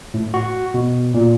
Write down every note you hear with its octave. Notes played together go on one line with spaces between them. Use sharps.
A2
F#4
B2
A#2